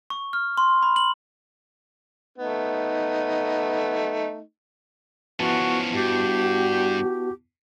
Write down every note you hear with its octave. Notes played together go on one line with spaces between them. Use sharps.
C#6
F6
C6
B5
F#7
A3 B3 D#4
F3 B3 C#4 E4 F#4 A5
G2 F#4 G4